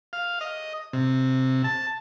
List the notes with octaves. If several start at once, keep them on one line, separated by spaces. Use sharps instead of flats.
F5
D#5
C3
A5